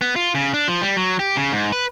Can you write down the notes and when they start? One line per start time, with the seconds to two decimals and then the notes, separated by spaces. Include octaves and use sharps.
0.01 B3
0.16 F4
0.35 C#3
0.54 D4
0.68 F3
0.82 G3
0.96 F#3
1.19 G4
1.36 C#3
1.52 G#2
1.72 B4